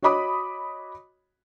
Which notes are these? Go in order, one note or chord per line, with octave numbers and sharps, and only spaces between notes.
F#4 C#5 D#5 B5 D6 D#6